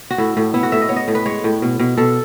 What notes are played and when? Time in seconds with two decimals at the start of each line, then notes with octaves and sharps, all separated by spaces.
0.10 F#4
0.18 A2 E4
0.37 A2
0.54 B3 E4
0.63 F#4
0.72 A2 E5
0.82 D#5
0.89 B3 C#5
0.96 D#5
1.08 A2
1.15 B4
1.25 G#3 C#5
1.44 A2
1.62 B2
1.79 B2
1.97 B2 A4